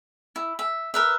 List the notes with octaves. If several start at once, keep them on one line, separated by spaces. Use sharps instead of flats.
E4
E5
A#4 B4 E5